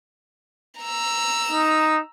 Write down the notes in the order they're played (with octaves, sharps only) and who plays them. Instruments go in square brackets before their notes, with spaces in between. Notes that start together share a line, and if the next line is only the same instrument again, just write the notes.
[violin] A#5 E6
[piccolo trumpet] D#4